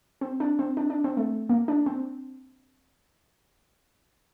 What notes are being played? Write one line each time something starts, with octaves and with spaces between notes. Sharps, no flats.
C4
D4
C4
D4
D4
C4
A3
A#3
D4
C4